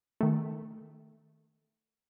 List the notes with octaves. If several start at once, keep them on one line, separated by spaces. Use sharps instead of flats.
D#3 A3